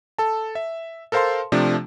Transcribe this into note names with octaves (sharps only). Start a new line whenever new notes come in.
A4 A5
E5
A4 A#4 C5 F5 A5 C6
C3 F3 A3 D4